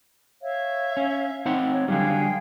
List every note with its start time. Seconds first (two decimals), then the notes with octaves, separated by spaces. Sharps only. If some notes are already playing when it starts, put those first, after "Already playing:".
0.42 C#5 E5 F5
0.97 C#4
1.46 C4 D#4 F#5
1.70 C#5
1.88 D3 F#3 G3 G#4 F5 G5